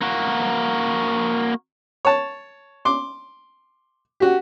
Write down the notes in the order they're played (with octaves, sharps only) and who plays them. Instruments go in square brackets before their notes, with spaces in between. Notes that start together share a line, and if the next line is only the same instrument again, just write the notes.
[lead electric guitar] A#3 F#4
[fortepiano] C#5 A5
C6 D6
F#4 G4